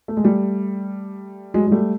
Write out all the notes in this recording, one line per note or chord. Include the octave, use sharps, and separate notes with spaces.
A3
G#3
G3 A3
F#3 G#3
G#3
G3 A3